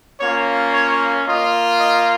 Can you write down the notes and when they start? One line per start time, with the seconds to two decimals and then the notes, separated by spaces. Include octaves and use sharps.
0.19 A#3 C#4 F4 C#5
0.72 C#5
1.24 A#3 F4 D#5
1.77 D#5